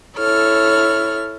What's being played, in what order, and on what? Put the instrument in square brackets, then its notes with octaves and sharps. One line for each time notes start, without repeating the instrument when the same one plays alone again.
[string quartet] E4 A4 C#5 F6